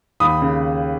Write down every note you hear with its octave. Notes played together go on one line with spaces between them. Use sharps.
D#2 B5 D#6
C#3